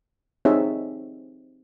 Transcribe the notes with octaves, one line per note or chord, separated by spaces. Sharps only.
C4 D#4 G#4 C#5 E5